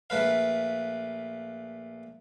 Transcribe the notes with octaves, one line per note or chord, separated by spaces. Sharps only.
A#1 A3 B4 F5